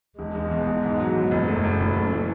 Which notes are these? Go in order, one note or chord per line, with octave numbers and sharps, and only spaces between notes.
E1 G#3
E1
E2
E1
G#2
F#3
E2 G#3
F#1
F#2 A3
F#2
F#1 A3
F#1
E3